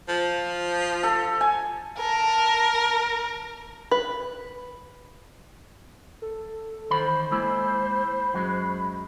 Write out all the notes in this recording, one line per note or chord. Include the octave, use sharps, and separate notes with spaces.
F3
A4
G#5
A#4 A5
B4
A4
D#3 E3 C5 B5
G#3 A#3 E4 B5
F#2 F#3 G#3